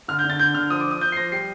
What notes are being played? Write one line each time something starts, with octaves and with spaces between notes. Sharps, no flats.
D3 F6
G6
D3
A6
D3 G6
D3 F6
F3 D#6
D6
F3
D#6
F3 G6
C7
F3 A#6
G3 C7